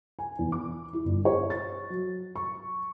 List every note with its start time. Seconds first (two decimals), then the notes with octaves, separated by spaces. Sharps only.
0.19 G#5
0.39 E2
0.52 D6
0.93 E4
1.05 G1
1.25 C#5
1.50 A6
1.90 F#3
2.36 C#6